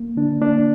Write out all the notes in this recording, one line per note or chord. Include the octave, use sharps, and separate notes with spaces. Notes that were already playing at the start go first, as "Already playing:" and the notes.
Already playing: A#3
D3 D4
A#3 D4